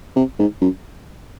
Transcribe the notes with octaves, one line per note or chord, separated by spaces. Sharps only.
C3
G#2
F#2